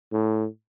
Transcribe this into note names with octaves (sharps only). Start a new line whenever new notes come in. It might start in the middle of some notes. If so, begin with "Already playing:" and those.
A2